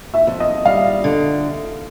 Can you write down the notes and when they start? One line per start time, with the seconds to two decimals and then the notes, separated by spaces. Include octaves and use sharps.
0.14 E5
0.27 F2
0.40 D#5
0.65 G3 F5
1.04 D3